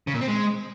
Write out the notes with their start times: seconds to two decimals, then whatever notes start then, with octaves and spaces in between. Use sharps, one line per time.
0.07 C#3
0.14 A#2
0.21 C4
0.28 G#3